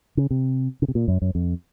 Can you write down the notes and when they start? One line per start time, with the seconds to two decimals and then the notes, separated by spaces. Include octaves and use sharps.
0.17 C#3
0.31 C3
0.82 C#3
0.88 C3
0.95 A#2
1.08 F#2
1.22 F#2
1.35 F2